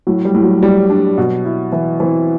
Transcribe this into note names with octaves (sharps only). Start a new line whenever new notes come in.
A2 F#3
G3
A2
F#3
G3
D4
B2
E4
E3 E4
E3 C4